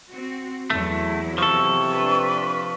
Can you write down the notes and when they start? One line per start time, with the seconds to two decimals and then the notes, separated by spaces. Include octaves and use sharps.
0.11 C4 F#4
0.70 E2 F#3 A3 E4
1.38 C3 F3 A4 C#6
1.92 D4 B4